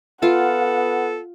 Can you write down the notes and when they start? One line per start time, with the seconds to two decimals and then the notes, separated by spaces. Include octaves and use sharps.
0.22 B3 F4 A4 F#5